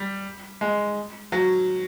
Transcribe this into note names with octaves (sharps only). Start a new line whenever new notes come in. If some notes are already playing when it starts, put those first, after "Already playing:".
Already playing: G3
G#3
F#3